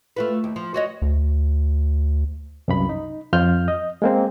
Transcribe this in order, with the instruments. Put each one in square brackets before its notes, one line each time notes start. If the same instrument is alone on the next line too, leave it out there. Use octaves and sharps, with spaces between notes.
[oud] A3 F4 B4
D#2
F3
F#4 C#5 D#5
[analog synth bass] D2
[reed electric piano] C2 F#2 B5
D#4
F2 F4 F6 G6
D#5
G#3 A#3 C4